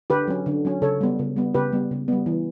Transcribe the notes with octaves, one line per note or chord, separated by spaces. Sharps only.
D3 G4 B4
F#3 C#4
D3
F#3 C#4
C#3 A4 C#5
G3 B3
C#3
G3 B3
C#3 G4 B4
G3 B3
C#3
G3 B3
E3